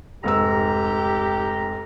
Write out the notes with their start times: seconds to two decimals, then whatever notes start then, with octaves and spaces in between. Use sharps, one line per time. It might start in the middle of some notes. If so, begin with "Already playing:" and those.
0.24 F1 G#2 G4 A#5 E6